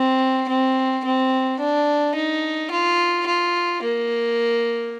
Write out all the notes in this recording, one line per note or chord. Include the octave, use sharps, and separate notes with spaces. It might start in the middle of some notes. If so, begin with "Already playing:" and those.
Already playing: C4
C4
C4
D4
D#4
F4
F4
A#3